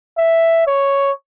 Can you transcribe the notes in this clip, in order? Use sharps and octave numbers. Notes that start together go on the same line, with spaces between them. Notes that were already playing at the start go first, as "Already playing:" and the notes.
E5
C#5